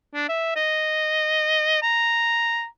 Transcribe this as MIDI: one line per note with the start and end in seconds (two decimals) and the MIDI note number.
0.14 0.28 62
0.29 0.56 76
0.56 1.78 75
1.82 2.65 82